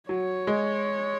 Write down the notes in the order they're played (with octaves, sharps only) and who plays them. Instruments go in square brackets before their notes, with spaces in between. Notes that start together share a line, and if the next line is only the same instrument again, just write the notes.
[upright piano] F#3 [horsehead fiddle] C#5
[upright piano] G#3